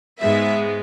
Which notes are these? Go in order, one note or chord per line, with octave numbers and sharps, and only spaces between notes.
G#2 G#3 B3 E5